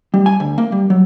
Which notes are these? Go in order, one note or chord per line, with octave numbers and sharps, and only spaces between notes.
G3
G#5
D2
A#3
G3
F#3